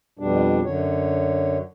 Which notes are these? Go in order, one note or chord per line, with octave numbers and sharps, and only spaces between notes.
F2 B2 G3 D4
F#2 D3 C#5